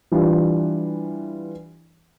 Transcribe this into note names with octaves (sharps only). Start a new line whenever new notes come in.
E3 G3 D4 F4